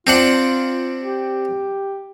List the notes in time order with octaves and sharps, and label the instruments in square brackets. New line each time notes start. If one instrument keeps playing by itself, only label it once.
[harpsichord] C4 D4 F#5 [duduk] F4
[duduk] G4